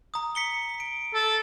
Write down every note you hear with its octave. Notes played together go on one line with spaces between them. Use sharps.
A#5 D#6
B6 C#7 G7
D7
A4